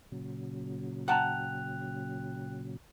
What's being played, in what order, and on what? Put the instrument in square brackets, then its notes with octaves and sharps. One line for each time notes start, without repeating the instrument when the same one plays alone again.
[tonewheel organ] A#2 C#3 F#3
[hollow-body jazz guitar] F#5 A5 A#5 [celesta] G5 F#6 F7